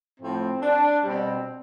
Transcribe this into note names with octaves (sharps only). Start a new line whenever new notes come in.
A2 F3 A3 C4
D4
B2 G3 C4